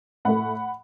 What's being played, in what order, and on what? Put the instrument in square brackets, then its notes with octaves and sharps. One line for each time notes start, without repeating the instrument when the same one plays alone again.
[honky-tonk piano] A2 A3 F#5 B5